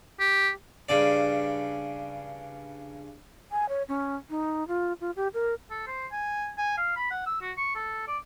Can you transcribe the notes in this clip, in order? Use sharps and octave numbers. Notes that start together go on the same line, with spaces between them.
G4
G2 C#3 D5
G#5
C#5
C#4
D#4
F4
F4
G4
A#4
A4
C5
G#5
G#5
F5
B5
F#5
E6
F#4
C#6
A4
D5